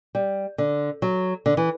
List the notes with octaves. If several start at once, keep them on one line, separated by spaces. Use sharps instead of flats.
G3
D3
F#3
D3
E3